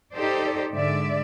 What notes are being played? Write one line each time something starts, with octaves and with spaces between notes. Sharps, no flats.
D#4 G4 A4 C5 D5
G#2 D3 G#3 D5 E5